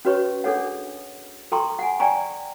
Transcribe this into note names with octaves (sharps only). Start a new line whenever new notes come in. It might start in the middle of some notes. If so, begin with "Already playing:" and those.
C#4 F#4 B4 C#5 C#6
D4 G#4 A4 C#5 F#5
A4 G5 A#5 C6 C#6
F#5 G#5
D5 G5 G#5 A#5 C#6